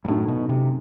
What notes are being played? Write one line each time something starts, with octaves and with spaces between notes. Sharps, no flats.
G2
F#2 A2 D#3 A3 D#4 F#4
B2
C3